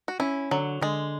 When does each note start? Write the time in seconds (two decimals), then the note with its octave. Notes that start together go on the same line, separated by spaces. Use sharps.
0.08 F#4
0.20 C#4 E4
0.51 D3 F#3
0.81 D3 G#3